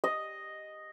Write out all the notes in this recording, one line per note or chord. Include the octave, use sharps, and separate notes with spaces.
D#5